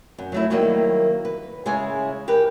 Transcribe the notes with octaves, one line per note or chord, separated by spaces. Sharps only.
F#2
F#3 A3 E4
D#3 F#3 G3 A#3 E4
B4
C#3 G#3 E4 G#4 C#5 G#5
G4 A#4 B4